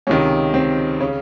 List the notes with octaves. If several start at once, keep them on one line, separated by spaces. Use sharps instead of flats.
C#2 C3 D#3 C#4
C4
C#3 C#4